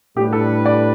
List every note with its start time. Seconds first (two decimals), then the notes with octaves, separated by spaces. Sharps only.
0.16 A2 G3 D4 G4 B4
0.33 A4
0.65 D5